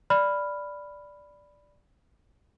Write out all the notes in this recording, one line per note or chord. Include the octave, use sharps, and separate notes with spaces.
D5 B5 F6